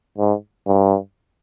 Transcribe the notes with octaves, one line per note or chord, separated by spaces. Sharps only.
G#2
G2